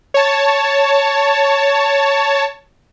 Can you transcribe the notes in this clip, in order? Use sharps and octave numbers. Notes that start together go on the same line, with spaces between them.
C#5 A5